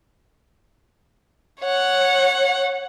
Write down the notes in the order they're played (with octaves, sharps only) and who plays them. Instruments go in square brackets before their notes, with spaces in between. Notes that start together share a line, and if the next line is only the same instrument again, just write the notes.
[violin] C#5 F#5